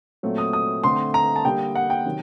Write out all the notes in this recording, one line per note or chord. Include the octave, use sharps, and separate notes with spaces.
A#2 F#3 A3 C4
D#6
D#6
D3 A3 C4 C6
A#5
A5
D3 G3 A#3 G5
F#5
G5
C3 D#3 F#3